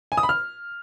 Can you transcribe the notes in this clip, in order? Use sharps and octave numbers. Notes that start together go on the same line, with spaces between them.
G#5
D#6
B5
F6